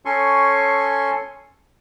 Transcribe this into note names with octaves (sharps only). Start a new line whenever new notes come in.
C#4 A4 G#5 C6 C#6